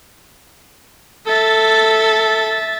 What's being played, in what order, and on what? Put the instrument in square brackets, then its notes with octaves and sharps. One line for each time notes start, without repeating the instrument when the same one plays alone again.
[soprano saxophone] A4 [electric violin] E5 A6